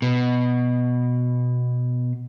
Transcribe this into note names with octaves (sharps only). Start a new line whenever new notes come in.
B2